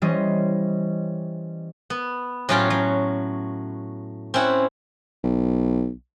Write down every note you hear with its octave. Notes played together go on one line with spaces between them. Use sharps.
E3 G3 C#4 C5 D#5
B3
A2 F#3 C#4 F4 G5
F#3
C4 C#4 E4 F#5
B1